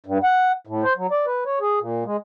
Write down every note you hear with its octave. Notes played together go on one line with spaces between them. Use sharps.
G2
F#5
A2
C5
F#3
D5
B4
C#5
G#4
A#2
G#3